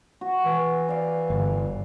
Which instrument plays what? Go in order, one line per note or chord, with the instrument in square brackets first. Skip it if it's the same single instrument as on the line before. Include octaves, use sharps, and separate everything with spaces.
[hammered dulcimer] F#4
[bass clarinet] E3
[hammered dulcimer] D5 F5
[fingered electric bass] G1